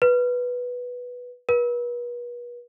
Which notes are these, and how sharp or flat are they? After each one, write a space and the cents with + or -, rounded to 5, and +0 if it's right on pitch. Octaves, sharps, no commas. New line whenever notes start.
B4 -5
B4 -40